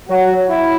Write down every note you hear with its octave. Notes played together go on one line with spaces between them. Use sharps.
F#3 F#4
E4